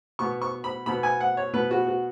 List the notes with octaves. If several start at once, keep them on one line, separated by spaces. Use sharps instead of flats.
B2 B3 C#6
C#6
B5
B2 B3 B5
G#5
F#5
C#5
B2 B3 B4
F#4
F#4